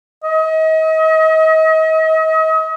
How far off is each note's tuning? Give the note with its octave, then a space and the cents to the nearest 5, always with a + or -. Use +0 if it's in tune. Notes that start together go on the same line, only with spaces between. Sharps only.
D#5 +40